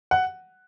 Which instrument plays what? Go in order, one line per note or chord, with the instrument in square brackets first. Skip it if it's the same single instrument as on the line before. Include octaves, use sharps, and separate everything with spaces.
[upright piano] F#5